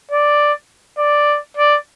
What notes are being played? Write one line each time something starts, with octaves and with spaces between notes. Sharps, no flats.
D5
D5
D5